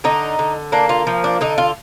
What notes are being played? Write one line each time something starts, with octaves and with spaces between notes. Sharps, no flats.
D3 D#4
D3
A#3 D4
F4
F3
D4
D3 D#4
F4